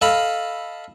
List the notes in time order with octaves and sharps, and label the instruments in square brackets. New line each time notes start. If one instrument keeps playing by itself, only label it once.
[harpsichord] A4 D#5 F5 B5